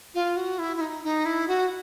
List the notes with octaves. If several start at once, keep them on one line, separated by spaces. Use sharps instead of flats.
F4
F#4
E4
E4
D#4
D#4
E4
F#4